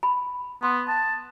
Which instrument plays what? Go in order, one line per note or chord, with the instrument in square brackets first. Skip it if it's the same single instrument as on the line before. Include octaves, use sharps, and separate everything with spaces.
[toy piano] B5
[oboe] B3 [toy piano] C6
[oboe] A5